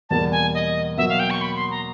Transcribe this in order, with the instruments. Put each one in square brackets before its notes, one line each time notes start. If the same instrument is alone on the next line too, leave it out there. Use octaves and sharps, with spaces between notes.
[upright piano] E2 B2 G3 A#3 [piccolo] A5
[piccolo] G#5
D#5
[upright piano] B2 F#3 A#3 [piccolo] E5
[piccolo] F5
G5
C#6
B5
C6
A#5